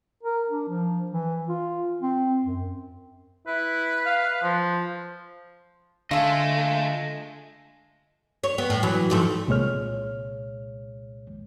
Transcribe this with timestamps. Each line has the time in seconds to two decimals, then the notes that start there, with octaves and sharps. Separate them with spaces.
0.23 A#4
0.49 D4
0.68 F3
1.11 E3
1.48 F4
2.02 C4
2.44 F#2
3.47 E4 B4
4.06 F5
4.43 F3
6.11 D3 A3 F4 A4 D#5 G#5
8.44 C#5
8.58 B3
8.70 A2
8.83 E3 F#3
9.10 G#2 F3 A3
9.48 C2 A#2 G#3 C#5 F6